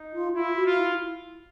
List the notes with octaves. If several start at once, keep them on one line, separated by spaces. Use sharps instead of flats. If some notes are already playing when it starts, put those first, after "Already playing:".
Already playing: D#4
F4
E4 F4
F#4
F4
E4